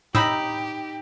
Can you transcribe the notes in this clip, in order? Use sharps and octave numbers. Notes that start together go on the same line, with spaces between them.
A2 D#4 G4 B5 E6